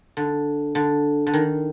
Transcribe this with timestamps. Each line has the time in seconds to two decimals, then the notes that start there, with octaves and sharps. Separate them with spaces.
0.17 D3
0.75 D3
1.27 D3
1.33 D#3